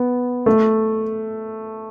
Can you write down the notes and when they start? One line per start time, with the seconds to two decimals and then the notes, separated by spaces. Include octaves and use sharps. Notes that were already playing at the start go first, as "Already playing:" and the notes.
Already playing: B3
0.46 A3